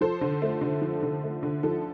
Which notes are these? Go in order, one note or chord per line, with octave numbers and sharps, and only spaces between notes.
F3 A4 C5
D3
A3
D3
F3
D3
A3
D3
F3 A4